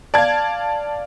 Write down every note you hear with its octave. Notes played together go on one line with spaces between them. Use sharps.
D5 F5 A5 G#6